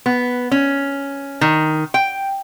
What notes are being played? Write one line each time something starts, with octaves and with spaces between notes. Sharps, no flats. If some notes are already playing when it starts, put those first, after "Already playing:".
B3
C#4
D#3
G5